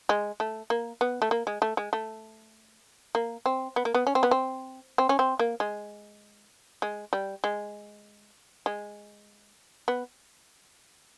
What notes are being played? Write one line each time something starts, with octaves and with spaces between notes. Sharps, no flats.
G#3
A3
A#3
B3
A3
A#3
G#3
A3
G#3
A3
A#3
C4
B3
A#3
B3
C#4
C4
B3
C4
C4
C#4
C4
A#3
G#3
G#3
G3
G#3
G#3
B3